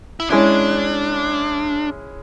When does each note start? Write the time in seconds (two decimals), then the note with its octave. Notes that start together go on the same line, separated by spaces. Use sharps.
0.20 E4
0.30 G#3 C#4 D4 E4